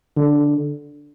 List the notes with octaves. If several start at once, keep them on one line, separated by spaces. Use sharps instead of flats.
D3